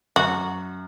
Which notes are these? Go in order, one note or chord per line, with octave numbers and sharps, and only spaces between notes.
F#2 F#4